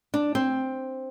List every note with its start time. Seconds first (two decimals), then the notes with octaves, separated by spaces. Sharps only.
0.14 D4
0.35 C4